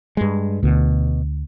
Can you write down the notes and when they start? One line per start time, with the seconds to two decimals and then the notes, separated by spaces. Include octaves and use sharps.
0.17 G2 G#3
0.63 D2 B2